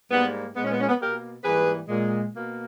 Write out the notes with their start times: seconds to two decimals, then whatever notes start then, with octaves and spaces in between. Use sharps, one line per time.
0.11 G#2 G3 A#3 B3
0.55 A#2 G#3 B3
0.64 C#4
0.72 B3
0.81 C#4
0.89 B3
1.00 B2 A#3 G4 A#4
1.44 G#2 E3 G3 A#3 G#4 B4
1.88 A#2 G#3
2.32 B2 A#3